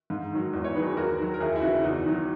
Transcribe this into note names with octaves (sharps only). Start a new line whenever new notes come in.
G#2
D#3 F#3
E2
C#5
D#3 F#3 G#4 B4
D#2 F#4 A#4
D#3 F#3
A#4
D#2 E4 G#4
E4
C#3 E3 D#4 F#4
E2 D#4 F#4
D#3 F#3